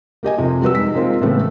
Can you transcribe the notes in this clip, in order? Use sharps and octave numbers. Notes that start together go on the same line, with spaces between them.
A#3 G4 D#5 G#5
F2 C3
G3 F#4 B4 E6
G#3 D#4 B6
G#3 A#3 C4 F4
A2 C#3 E3 A3 B3